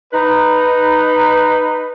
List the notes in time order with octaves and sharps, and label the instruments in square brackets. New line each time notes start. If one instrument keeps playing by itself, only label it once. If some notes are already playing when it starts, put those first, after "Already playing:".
[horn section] D#4 B4